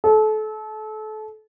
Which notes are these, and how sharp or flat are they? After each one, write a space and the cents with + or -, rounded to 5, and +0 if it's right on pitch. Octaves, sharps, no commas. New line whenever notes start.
A4 -30